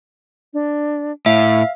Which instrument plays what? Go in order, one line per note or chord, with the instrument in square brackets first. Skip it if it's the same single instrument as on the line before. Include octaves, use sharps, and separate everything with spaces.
[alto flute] D4
[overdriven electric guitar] A2 [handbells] E5 [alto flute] F5